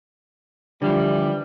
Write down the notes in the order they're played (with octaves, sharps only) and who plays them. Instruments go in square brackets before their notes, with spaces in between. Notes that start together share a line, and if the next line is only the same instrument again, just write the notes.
[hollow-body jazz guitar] D3 F3 [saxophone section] E3 G3